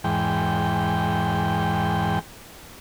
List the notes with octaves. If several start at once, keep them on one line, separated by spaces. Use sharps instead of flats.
E2 G#2 G5